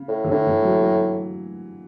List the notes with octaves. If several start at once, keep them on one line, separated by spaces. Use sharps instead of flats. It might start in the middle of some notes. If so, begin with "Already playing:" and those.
Already playing: C#3
A2
E3
A2 D3
E3
F#3
F#3